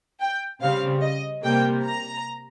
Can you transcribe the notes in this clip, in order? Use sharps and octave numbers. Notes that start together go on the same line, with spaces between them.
G5
C#3 G3 C4 F5
D#5
C3 G3 A#3 G5
A#5